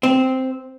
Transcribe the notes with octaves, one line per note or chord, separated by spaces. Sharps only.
C4